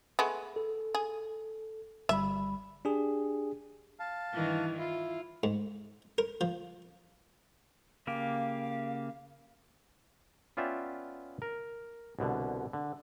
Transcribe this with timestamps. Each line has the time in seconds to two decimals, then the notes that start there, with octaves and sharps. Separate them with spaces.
0.19 G#3 A3 B3
0.56 A4
0.95 G#4
2.09 G1 G3 E5 B5
2.85 D4 G4 G#4
4.00 F5 A5
4.33 G2 D#3 E3
4.78 E4 F4
5.43 G#2
6.18 A#4
6.41 F3
8.07 C#3 A#3 G4 F5
10.57 B3 C#4 F4 D5 E5 G5
11.42 A#4
12.19 C2 B2 D3
12.73 D3